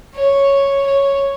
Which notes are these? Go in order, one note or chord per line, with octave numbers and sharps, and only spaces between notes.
C#5
C#5